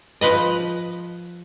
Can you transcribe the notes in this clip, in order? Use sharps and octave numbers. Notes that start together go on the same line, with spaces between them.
F3 B4 D#5